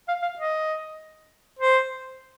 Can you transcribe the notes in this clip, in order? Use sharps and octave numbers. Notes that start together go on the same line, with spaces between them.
F5
F5
D#5
C5